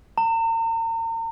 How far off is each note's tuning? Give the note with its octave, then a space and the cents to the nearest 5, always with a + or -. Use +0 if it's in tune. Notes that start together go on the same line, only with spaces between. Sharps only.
A#5 -40